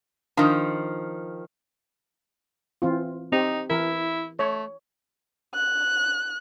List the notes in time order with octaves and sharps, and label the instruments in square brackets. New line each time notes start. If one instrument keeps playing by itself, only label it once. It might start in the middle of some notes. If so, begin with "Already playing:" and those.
[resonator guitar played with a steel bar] D#3 F3 [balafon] D4
[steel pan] E3 C4 F4
[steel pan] C4 G4 [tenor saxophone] D#4
[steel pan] E3 A#4 [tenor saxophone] E4
[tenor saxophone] A3 [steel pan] C#5
[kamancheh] F#6